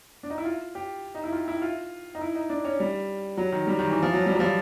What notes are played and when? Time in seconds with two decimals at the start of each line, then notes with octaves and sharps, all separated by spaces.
0.23 D4
0.30 D#4
0.38 E4
0.45 F4
0.75 G4
1.15 D#4
1.24 E4
1.33 F4
1.48 E4
1.62 F4
2.15 D#4
2.21 E4
2.35 D#4
2.50 D4
2.65 C#4
2.80 G3
3.37 F#3
3.52 D#3
3.67 G3
3.79 D#3
3.91 E3
4.03 F3
4.13 F#3
4.26 G3
4.35 F#3
4.40 F3